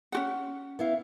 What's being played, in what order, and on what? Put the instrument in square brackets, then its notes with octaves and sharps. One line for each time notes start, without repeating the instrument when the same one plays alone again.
[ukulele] C#4 F#4 F#5
[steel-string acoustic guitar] B3 E4 F5